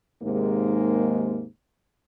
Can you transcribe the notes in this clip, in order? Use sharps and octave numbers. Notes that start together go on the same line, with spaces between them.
D#2 G#2 C3 G#3 A#3 D#4